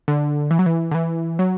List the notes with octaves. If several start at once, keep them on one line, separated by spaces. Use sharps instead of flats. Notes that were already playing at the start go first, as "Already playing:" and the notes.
D3
E3
F#3
E3
D3
E3
F#3